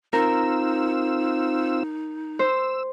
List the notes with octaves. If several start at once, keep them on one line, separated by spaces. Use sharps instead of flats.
C4 D#4 F4 A#4 E6
C5 E6